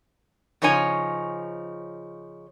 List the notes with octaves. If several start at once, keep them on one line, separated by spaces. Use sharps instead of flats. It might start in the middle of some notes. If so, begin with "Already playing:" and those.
C#3 F3 D#4 C#5 G#5